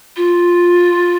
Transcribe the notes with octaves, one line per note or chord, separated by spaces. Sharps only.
F4